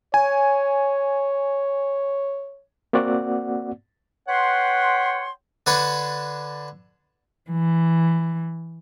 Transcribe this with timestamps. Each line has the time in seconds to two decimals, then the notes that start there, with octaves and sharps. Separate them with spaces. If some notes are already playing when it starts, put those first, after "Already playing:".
0.14 C#5 G#5
2.93 A#3 C4 F#4 D5 F#5
4.28 B4 C#5 F#5 G5 C6
5.66 D3 D4 B4 C#5 A5 B5
7.50 E3